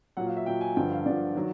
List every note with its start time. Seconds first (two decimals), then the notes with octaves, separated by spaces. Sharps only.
0.17 A#2 F#3 F#5
0.27 F5
0.37 E5
0.46 A#2 F#3 G5
0.61 G#5
0.76 G2 D3 F3 G5
0.92 F5
1.06 G2 D3 F3 D5
1.36 D#3 F#3